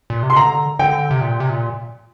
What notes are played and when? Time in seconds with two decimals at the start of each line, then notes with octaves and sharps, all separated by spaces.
0.10 A#2
0.23 C3
0.30 C6
0.36 D3 A#5
0.79 D3 G5
1.11 C3
1.21 A#2
1.40 C3
1.50 A#2